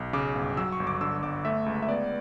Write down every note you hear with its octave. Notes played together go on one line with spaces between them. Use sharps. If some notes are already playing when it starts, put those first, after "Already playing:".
Already playing: B1
C#3 D6
G1
F#3 E6
C#6
G1
D6
D3 E6
G1 D6
A3 E5
C#2
E5
B3 D5